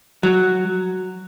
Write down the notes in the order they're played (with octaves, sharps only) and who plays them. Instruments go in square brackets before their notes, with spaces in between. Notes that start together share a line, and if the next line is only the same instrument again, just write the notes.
[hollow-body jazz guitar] F#3